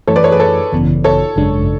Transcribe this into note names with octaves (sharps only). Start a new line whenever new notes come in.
F#2 E3 A3 A4 C#5
B4 D5
A4 C#5
G#4 B4
A4 C#5
G#1 F#2 C#3 E3 B3
A4 C#5
G#1 F#2 C#3 G#3 D4